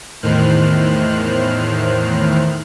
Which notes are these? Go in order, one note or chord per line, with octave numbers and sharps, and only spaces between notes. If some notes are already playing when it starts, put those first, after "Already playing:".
E2 A2 D#3 C5 F6 F#6